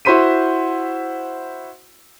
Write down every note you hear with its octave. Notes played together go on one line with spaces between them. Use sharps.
E4 F#4 C5 C6 B6 D#7